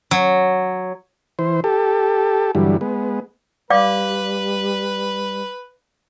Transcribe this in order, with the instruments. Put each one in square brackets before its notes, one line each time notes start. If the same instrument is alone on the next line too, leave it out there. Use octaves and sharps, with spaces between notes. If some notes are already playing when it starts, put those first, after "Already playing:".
[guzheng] F#3
[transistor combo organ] E3 C5
G4 A4
G2 D3 E3 F#3 G3
G#3 B3
[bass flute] G3 [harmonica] B4 [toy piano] D5 F5 D6